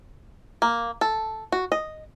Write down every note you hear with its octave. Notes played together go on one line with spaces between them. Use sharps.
A#3
A4
F#4
D#5